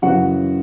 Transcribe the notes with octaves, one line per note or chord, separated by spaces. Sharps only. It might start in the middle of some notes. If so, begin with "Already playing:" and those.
F#2 C#3 E3 F#4 F#5